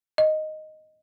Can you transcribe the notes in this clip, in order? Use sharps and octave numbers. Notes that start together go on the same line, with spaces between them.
D#5